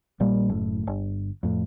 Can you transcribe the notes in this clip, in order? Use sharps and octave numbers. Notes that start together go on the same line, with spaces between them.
A#1 A#2 G3 A#3
F#1 A2
G1
F2 A2